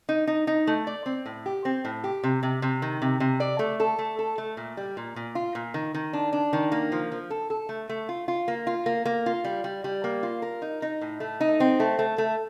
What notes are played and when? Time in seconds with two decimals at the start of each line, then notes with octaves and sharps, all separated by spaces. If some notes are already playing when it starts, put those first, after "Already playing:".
0.09 D#4
0.27 D#4
0.47 D#4
0.67 A3
0.87 D5
1.06 C4
1.26 A2
1.46 G4
1.65 C4
1.85 A2
2.04 G4
2.24 C3
2.43 C3
2.62 C3
2.82 D#3
3.02 C3
3.20 C3
3.40 D5
3.59 A3
3.80 A4
3.99 A3
4.19 A4
4.38 A3
4.57 A#2
4.77 G3
4.97 A#2
5.16 A#2
5.35 F4
5.55 A#2
5.74 D#3
5.94 D#3
6.13 D4
6.33 D4
6.53 D#3
6.72 A#3
6.92 F3
7.12 F3
7.30 A4
7.50 A4
7.69 A3
7.89 A3
8.09 F4
8.28 F4
8.48 A#3
8.67 F4
8.86 A#3
9.05 A#3
9.26 F4
9.45 G3
9.64 G3
9.84 G3
10.04 A#3
10.23 F4
10.42 A#4
10.62 D#4
10.82 D#4
11.01 A2
11.20 A3
11.41 D#4
11.60 C4
11.80 A3
11.99 A3
12.18 A3